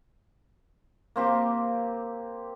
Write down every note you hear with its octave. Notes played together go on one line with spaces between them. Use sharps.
A#3 C4 G4